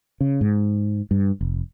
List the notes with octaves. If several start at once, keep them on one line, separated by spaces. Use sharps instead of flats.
C#3
G#2
G2
F1